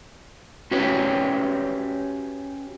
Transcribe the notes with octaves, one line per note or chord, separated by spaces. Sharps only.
C#4 F#4 G4 B4 C#5